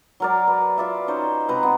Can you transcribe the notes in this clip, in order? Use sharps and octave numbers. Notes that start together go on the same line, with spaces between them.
F#3 A#4 D5
B4
F4 D5 E5
C#4 D#4 C5
C3 B4 A#5
B3